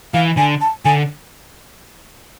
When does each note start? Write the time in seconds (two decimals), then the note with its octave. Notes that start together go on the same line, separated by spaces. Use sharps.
0.14 E3 F5
0.37 D3 G#5
0.61 A5
0.85 D3 G#5